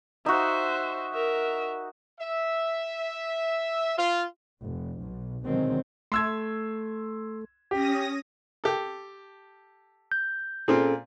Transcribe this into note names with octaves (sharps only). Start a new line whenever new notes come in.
D#4 F#4 C5 E5
A#4 E5
E5
F4
F1
B1
B2 D3 D#3 F#3 G#3 C4
A3 C6 E6 G#6
C#4 G4 D#6 A#6
G4 A4
G6
A#2 C4 C#4 F4 G#4 A4